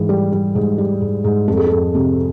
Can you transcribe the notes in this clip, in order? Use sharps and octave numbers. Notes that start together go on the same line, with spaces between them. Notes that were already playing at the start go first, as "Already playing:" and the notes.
Already playing: G#2 E3
G3
G3
G#2
G3
G#2
G#2
F2 A4
G#4
A4
F2
C3